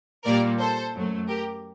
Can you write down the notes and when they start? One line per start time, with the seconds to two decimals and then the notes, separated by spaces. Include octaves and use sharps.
0.24 A#2 G3 A#3 A#4 D5
0.59 A4 C5
0.94 F#2 F#3 A3
1.28 G4 A#4